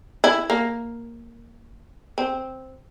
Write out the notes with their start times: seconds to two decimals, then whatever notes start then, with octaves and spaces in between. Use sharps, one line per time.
0.24 E4
0.50 A#3
2.18 C4